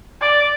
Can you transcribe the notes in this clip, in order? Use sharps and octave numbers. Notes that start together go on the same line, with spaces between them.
D5